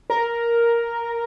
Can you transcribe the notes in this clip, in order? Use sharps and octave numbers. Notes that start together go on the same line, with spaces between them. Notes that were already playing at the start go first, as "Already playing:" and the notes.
A#4